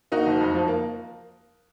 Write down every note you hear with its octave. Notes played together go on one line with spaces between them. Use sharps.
A#3 D#4 F#4
F#1
F2
F3
A#3